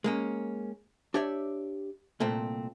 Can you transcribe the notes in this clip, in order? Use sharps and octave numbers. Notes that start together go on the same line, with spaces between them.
G#3 A#3 C#4
D4 G4 C#5 D5 E5
C2 A#2 A3 C4